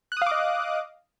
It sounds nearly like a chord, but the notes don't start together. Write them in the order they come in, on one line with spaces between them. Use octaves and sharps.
F#6 D#6 F5 D6 D#5